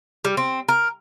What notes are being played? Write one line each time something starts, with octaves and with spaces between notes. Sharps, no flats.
G3
C4
A#4